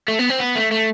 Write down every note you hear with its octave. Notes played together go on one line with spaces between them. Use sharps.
A3
B3
C4
B3
A3
A3